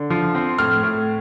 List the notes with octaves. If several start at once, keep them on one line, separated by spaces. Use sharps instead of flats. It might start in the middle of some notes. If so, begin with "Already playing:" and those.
Already playing: D3
F3
C4
A2 F6
A2